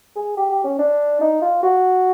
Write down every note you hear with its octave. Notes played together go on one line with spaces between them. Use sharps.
G#4
G4
G4
C#4
D4
D#4
F4
F#4